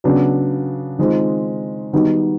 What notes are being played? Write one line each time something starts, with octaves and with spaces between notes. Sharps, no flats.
C#3 F#3 B3 D4
D#3 G#3 C4 F4
D#3 G3 B3 D#4 F#4